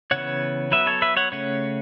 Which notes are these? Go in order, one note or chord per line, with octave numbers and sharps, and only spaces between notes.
C#3 E3 B3 C#5 F#5
F#3 B3 B4 E5
A4 C#5
B4 E5
C#5 F#5
C#3 A3 C#4 C#5 F#5